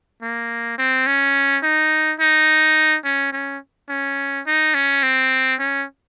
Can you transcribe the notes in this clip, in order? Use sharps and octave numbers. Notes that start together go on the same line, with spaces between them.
A#3
C4
C#4
D#4
D#4
C#4
C#4
C#4
D#4
C#4
C4
C#4